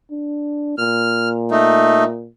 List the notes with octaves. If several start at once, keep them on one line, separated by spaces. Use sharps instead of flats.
D4
A#2 F6
A3 D#4